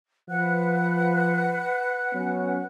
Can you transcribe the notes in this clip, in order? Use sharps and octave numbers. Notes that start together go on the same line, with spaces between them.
F3 B4 F#5 F#6
F#3 B3 C#4